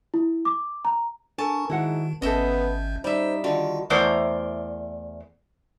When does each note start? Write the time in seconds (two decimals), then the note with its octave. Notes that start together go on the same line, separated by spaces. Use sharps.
0.14 E4
0.45 D6
0.85 A#5
1.38 D4 A4 A#4 G#5 A5 C#6
1.70 G#2 D#3 E4 F#4 F#5
2.22 G#1 B3 C#4 A4 D#5 E5 G6
3.04 G3 D#4 C5 E5
3.44 D3 D#3 F4 F#4
3.90 E2 A3 A#4 C5 D5